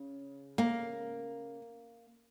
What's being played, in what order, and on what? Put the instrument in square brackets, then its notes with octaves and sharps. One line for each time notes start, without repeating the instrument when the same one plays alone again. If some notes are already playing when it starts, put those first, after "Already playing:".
Already playing: [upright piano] C#3
[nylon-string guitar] A#3